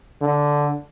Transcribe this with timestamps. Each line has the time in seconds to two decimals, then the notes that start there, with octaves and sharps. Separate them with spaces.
0.22 D3